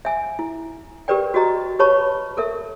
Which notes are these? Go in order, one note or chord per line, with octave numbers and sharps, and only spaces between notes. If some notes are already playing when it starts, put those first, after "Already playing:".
E5 G#5
E4
G4 A#4 B4 D5 G5
F#4 G4 D#5 A#5
G4 B4 C#5 A5 B5 C#6
A4 A#4 E5